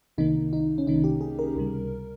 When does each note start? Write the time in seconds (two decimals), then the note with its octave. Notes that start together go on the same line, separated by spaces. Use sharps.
0.18 C2 C3 D#3 A#3 D#4
0.53 D#4
0.78 C#4
0.86 C2 C3 D#3 A#3 D#4
1.04 G4
1.21 G#4
1.39 A#4
1.56 C#2 C3 G3